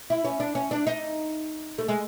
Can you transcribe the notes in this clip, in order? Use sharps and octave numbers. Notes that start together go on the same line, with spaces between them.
E4
C#4
D4
C#4
D4
D#4
A3
G#3